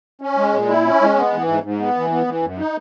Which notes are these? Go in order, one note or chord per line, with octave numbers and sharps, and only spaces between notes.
C#4
G#3
A#2
E4
C#4
G#3
B3
E3
G#2
G#2
B3
E3
B3
E3
F#2
D#4